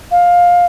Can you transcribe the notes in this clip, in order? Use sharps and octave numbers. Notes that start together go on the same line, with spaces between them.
F5